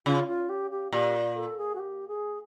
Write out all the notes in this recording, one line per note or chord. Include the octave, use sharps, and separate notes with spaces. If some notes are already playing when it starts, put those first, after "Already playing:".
C#3 F4
F4
G4
G4
A#2 G4
A4
G#4
F#4
G4
G#4